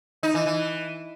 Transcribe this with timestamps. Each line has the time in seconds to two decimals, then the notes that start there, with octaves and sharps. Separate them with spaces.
0.23 D#4
0.34 E3
0.46 E3